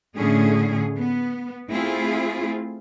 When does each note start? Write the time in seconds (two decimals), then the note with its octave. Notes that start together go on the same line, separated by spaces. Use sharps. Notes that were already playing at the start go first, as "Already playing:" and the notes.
0.17 A2 D3 A3 C#4 G#4
0.97 B3
1.71 A3 C4 E4 F4 G#4